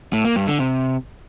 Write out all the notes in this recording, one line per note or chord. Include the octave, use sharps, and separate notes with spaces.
A2
A#3
G2
D3
C3